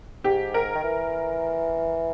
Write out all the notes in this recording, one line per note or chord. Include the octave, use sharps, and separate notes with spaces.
G#2 G4
A#4
D#3
E3